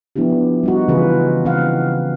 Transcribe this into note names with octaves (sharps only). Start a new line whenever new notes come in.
F3 B3 D4 E4 G4
G3 D#4 F#4
C#3 E3 C#4 F4 G#4 B4
C#3 C4 F5 F#5